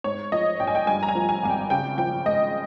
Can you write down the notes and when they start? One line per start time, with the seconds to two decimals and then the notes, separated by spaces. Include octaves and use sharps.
0.04 G#2 C#5
0.32 F3 D#5
0.60 A#1 G5
0.67 G#5
0.75 G5
0.87 G2 G#5
1.03 A#5
1.09 G#5
1.15 F3
1.29 G#5
1.43 G#1 G#5
1.50 G5
1.70 C#3 G5
1.98 F3 G5
2.26 G#3 D#5